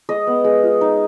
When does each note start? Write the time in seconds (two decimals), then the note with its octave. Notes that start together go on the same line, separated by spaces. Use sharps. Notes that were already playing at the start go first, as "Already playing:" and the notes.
0.09 G#3 D#5
0.27 B3
0.44 G#3
0.63 F4
0.81 D#4